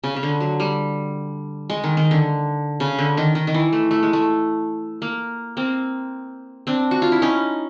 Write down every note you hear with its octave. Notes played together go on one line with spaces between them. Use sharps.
C#3
C#3
D3
F#3
G3
G#3
D#3
D#3
D3
C#3
D3
D#3
D#3
D#3
E3
A3
A3
G#3
A3
A#3
A#3 C4
C4 D4
F#4
F4
E4
C#4 D#4